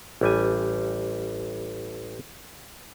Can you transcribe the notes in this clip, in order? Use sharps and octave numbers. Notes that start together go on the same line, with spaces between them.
A1 G3 G#5